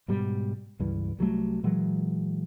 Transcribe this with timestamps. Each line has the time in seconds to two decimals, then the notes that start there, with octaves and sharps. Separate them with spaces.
0.08 G#2 B2 G3
0.79 C#2 G2 E3
1.19 C2 F#3 G3 A3
1.63 A#2 E3 F#3 G#3